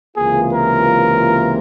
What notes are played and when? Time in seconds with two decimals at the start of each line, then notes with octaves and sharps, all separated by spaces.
0.16 C#2 C3 E3 A#3 F4 G#4
0.53 A#4